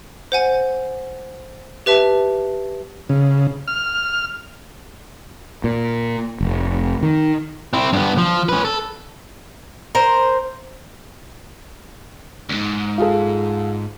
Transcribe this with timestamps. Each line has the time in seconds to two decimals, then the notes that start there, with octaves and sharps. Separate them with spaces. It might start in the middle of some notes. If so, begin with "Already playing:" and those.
0.32 C5 F#5 G#5
1.86 G4 B4 E5 A5
3.09 C#3
3.68 F6
5.64 A#2
6.41 F1
7.03 D#3
7.73 C4 E4
7.93 G2 B3
8.18 F3
8.49 C#4 B4
8.65 A4
9.95 A#4 C5
12.49 D2 G#2
12.98 F4 G#4 A4